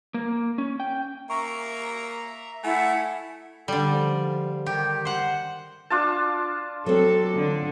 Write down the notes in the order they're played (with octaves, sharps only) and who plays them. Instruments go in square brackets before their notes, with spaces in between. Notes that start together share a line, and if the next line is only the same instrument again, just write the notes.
[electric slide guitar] A#3
C#4
G5
[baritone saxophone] A#3 [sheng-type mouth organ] E5 A#5 [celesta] C#6
[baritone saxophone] A3 [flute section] E4 F#5 [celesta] G#5
[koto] D3 G3 [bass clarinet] A4
[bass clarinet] F3
[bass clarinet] D#3 [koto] G4
[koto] C5 F#5
[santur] D4 F4 A5
[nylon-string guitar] F#3 C4 [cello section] A4
[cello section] D3